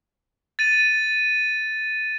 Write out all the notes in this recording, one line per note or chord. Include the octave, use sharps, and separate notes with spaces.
A6 D#7